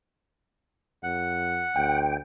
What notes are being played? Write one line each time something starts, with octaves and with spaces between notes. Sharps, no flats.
F2 F#5
D2 G5